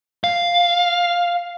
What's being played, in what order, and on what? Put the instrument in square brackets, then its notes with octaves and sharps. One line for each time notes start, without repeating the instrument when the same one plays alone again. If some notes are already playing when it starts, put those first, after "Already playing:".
[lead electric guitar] F5